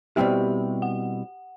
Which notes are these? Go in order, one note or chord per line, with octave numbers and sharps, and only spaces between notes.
B2 G3 C4 E4 G4 G5
F#5